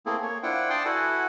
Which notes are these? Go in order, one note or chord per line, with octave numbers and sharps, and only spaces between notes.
A3 A#3 C4 E4 G#4 A4
A#3 C#5
D4 E4 F4 C5 F#5 G5
D5 G5 A5 C6 D#6
E4 F#4 A4 B4 F#5 G#5